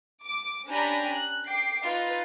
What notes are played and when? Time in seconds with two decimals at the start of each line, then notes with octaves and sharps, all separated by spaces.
0.24 D6
0.68 C#4 D4 G4 G#5 A#5 B5
1.12 F#6
1.47 G5 D6 C7
1.83 D#4 F4 B4